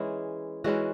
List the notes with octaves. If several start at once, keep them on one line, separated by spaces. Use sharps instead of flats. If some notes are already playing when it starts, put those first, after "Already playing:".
Already playing: E3 G#3 C#4 E4 G#4
E3 G#3 C#4 E4 F#4